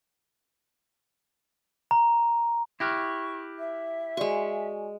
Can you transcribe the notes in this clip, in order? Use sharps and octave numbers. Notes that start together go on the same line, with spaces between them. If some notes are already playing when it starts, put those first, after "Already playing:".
A#5
E4 G4 C#6 F6 F#6 A#6
E5
G#3 F#4 D5 G#5 C#6